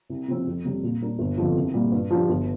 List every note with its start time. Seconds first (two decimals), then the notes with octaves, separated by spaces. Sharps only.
0.10 C2
0.28 C3 F3 C4
0.47 F2
0.65 C3 G3 C4 G4
0.83 A#2
1.01 G3 D4 A#4
1.19 G1
1.37 F2 D3 F3
1.56 C2
1.74 A#2 G3 A#3
1.92 G2
2.10 F3 D4 G4
2.29 G1